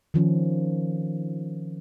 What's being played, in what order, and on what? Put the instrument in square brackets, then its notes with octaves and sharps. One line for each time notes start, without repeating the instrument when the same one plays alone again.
[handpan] D#3 F3 C#4